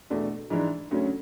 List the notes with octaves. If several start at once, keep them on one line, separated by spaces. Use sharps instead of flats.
E2 B2 A3 D4
G#2 E3 G#3 D4
D2 C#3 F#3 C#4